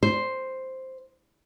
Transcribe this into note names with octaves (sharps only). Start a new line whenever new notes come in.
C5